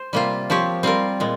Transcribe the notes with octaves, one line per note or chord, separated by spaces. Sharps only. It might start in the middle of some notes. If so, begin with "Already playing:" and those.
Already playing: C5
C3 G3 A#3 F4
F3 C4 G4 C#5
G3 C4 F4 A#4
A#2 G#3